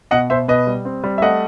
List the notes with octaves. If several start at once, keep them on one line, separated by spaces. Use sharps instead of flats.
B2 D#5 F#5
B2 C5 E5
B2 B4 D#5
G3
C4
G3
E5
A3 D#5 F#5